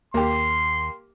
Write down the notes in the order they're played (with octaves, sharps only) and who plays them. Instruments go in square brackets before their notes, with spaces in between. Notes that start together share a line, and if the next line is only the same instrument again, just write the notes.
[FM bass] D#2 [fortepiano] A#3 G4 [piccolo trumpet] C6